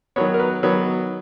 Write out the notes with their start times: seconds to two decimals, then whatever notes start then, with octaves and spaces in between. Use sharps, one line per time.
0.16 D#3 F#3 B3 C#5
0.34 A#4
0.39 B4
0.63 D#3 F#3 B3